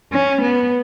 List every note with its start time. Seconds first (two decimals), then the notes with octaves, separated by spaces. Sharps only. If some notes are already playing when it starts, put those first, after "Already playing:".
0.12 C#4
0.41 B3